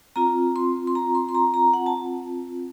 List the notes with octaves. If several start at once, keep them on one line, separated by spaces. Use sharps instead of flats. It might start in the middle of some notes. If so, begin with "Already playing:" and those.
C4 F4 A#5
C6
C6
A#5
C6
C6
A#5
A#5
F#5
A5